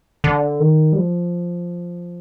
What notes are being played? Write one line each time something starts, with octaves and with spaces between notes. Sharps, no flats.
D3
D#3
G3
F3